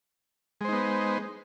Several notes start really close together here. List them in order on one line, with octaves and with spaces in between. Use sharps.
G#3 C5 D#4 B3